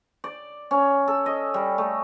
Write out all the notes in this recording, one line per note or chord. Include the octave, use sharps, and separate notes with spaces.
D5
C#4
A4
D#5
G3
A3